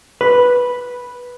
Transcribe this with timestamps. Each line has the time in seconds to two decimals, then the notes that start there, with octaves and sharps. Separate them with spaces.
0.21 B4